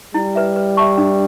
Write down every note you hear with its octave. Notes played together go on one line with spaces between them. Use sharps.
G3 E4
B4 E5
B4
E5 A5 C#6
D4